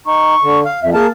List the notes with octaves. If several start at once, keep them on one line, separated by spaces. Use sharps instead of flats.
D#4 C#6
D3
F5
F2 E5
A#3 G#4 A#4 A5